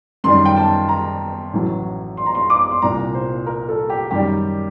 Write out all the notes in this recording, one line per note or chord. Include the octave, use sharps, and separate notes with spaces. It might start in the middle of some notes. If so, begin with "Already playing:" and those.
F#2 D#3 G3 C6
G5
A5
A#5
A1 A2 F#3
C6
A#5
C6
D6
C6
C2 A#2 G3 A#5
C5
A#4
A4
G4
F#2 D#3 G3 G4